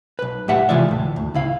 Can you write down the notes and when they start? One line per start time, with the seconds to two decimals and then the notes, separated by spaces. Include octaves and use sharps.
0.19 B1 B4
0.48 A2 G4 E5 F#5
0.69 C3 E3 G#3 F4 D5 E5
0.89 D2 A2
1.16 D2
1.34 C#2 E4 F5